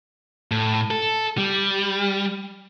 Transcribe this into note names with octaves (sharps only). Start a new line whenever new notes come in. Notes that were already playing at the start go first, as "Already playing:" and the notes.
A2
A4
G3